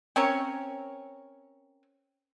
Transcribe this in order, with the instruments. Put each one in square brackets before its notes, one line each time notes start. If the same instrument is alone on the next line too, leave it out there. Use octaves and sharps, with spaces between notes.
[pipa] C4 C#4 A#4 C#5